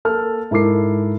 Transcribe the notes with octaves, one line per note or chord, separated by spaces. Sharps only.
A#3 A4 F6
G#2 E4 A4 A#4 D6 C7